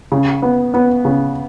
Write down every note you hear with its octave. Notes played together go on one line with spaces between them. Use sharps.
C#3
B3
B3
C#3